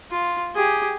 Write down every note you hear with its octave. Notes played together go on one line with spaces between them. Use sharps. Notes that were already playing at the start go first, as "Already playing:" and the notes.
F4
G4 G#4